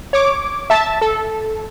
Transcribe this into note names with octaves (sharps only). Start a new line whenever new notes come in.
C#5 D6
E5 A5 A6
A4